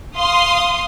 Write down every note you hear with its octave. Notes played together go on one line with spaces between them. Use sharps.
F5 C6 D#6